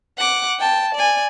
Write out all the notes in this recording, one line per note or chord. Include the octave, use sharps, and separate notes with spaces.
F#5 D6
G5 A5
D5 G#5